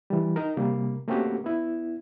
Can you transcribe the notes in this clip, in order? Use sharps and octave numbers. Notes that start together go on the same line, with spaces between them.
E3 G3
D#4 A#4
C3 G3 A#3
A3 A#3 C4 C#4 F#4 G4
B3 E4